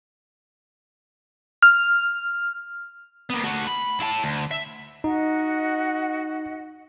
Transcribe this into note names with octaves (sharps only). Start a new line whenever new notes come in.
F6
A#3 B3
A3 F#4
B5
E4 A5
D2
E5
D#4 F#4 D#5 F#5